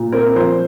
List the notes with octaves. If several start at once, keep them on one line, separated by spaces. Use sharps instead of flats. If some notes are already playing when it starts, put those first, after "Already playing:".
Already playing: A#2
C4 A#4
F3 C5